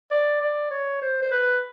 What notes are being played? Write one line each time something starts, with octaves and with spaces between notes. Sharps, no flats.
D5
D5
C#5
C5
C5
B4